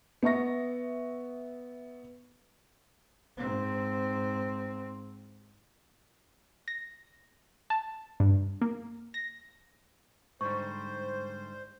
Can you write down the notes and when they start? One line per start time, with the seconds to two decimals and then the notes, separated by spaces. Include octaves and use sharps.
0.23 B3 E5 C#6 A#6
3.37 G#2 C4
6.68 A#6
7.70 A5
8.20 G2
8.62 A#3
9.14 A#6
10.41 G#2 D3 G3 C5 C#6